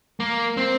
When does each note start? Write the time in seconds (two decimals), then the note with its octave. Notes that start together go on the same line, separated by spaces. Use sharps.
0.20 A#3
0.57 C4